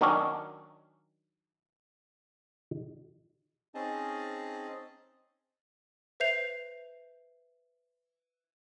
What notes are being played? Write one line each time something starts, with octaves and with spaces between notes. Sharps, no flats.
D#3 F#3 C#4 D4
C4 C#4 D#4 G#4 D#5 A5
B4 C5 E5 G6 C7 F7